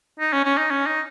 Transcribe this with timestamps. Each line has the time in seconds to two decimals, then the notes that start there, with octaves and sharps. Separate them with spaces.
0.20 D#4
0.33 C#4
0.45 C#4
0.58 D#4
0.71 C#4
0.87 D#4